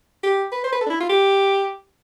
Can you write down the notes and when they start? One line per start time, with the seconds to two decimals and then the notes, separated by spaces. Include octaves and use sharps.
0.23 G4
0.52 B4
0.64 C5
0.72 B4
0.81 A4
0.86 D4
0.90 E4
1.00 F4
1.09 G4